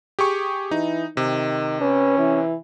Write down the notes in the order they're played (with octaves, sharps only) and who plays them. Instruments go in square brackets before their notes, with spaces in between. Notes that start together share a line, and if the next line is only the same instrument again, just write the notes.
[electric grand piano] G4 G#4 C#6
[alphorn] E3 [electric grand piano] D#4
[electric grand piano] C3 [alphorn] D#3
[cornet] C#4 [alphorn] B4
[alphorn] E3